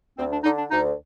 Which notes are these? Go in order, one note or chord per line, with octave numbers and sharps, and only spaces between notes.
D2 C4
D4
D3 D#4
D4
D2 D#4